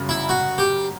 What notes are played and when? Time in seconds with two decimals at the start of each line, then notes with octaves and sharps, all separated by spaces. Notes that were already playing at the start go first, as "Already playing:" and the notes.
Already playing: G1 F#2 C#3
0.09 E4
0.29 F#4
0.58 G4